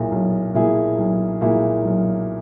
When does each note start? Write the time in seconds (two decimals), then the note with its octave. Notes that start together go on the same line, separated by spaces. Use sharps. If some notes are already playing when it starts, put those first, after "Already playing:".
Already playing: B1 A#2 A#3 E4 G#4
0.12 B1
0.54 A#2 A#3 E4 G#4
0.98 B1
1.41 A#2 A#3 E4 G#4
1.84 B1